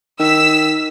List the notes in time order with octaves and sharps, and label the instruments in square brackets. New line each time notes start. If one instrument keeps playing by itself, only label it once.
[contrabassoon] D#3 [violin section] E6 B6